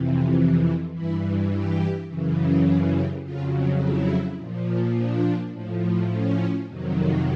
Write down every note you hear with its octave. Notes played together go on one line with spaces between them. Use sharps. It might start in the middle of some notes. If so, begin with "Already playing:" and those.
Already playing: F2 C3 E3
G2 E3 E4
G4
F#2 C#3 E3
G#4
G4
F2 C#3 F#3 F4
E4
A#2 F3
D4
A2 F3
C#4
F2 C3 D#3 F#3